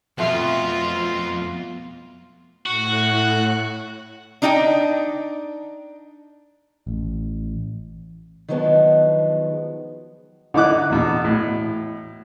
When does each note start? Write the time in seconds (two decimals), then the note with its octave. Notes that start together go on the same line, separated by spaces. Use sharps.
0.18 F2 B2 A3 B3 F4
2.66 A2 F#4 F#6
4.42 D4 D#4 D#5 F5 G5
6.87 A1
8.48 D#3 F3 F#3 G#3 B3 D4
10.54 D3 D#4 E4 D6 F#6
10.90 E2 B2
11.24 A2